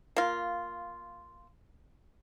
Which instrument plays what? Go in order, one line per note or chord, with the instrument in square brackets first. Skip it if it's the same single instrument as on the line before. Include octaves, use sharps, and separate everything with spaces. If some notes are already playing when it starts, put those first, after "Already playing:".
[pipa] A#3 F4